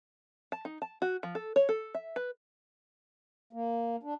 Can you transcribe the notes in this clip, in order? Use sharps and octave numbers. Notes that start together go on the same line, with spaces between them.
A5
D#4
A5
F#4
F3
A4
C#5
A4
E5
B4
A#3
D4